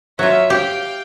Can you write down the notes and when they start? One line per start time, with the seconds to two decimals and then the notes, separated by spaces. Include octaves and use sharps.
0.19 F#3 F4 C#5 E5
0.50 G4 F5 G5